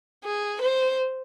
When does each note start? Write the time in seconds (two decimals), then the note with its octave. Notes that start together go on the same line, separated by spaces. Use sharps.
0.24 G#4
0.62 C5